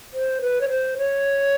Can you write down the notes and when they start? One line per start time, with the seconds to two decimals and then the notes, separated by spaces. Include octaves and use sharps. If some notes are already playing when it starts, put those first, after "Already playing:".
0.14 C5
0.42 B4
0.61 C#5
0.69 C5
0.98 C#5